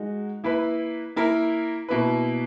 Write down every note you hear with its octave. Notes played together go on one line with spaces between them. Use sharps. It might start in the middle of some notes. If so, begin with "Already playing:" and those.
Already playing: G#3 D#4 F#4
A#3 E4 B4
A#3 E4 A#4
B2 A#3 E4 B4